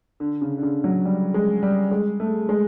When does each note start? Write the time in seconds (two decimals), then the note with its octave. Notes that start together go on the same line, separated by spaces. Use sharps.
0.20 D3
0.41 C#3
0.58 D3
0.63 C#3
0.84 F#3
1.05 G3
1.34 G#3
1.63 G3
1.91 G#3
2.20 A3
2.49 G#3